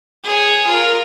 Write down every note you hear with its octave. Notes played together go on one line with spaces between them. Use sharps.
G#4 C#5
F4 A#4